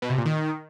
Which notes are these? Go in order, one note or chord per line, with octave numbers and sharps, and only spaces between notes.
B2
C3
A#2
D#3